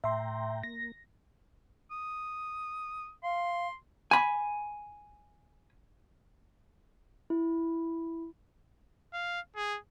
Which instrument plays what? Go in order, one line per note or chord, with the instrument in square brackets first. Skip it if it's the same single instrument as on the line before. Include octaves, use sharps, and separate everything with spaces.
[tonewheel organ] A2 G5 A#5 [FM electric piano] E5 C6
[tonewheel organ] A#3 [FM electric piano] A#6
[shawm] D#6
[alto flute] F5 [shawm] C6
[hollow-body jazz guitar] G#5 B5
[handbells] E4
[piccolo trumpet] F5
G#4